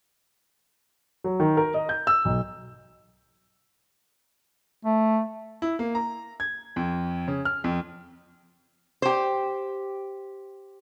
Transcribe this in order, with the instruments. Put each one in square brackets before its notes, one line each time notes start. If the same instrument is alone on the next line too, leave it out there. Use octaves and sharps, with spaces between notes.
[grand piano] F#3
D#3
A#4
D#5
G6
E6
B1
[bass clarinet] A3
[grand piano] E4
A#3
A#5
G#6
F2
C#3
F6
F2
[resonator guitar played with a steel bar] G4 C5